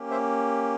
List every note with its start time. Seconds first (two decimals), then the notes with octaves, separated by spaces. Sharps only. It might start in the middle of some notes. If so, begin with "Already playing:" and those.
Already playing: A#3 C#4 G4
0.11 C5 E5